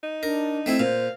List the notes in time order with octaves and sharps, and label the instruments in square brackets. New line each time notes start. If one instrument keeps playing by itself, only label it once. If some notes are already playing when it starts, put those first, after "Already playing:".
[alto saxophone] D#4
[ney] D4 [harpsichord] A#4
[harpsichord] A3 C4 E4
[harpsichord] A#2 [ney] C5 [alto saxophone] F5